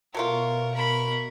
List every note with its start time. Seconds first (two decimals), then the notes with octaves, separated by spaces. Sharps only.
0.15 B2 F#3 A3 F4 A#4 C#6
0.75 A#4 B5